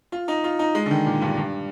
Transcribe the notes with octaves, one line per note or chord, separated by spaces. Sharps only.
F4
D#4
F4
D#4
G#3
D3
D#3
A#2
G2
G2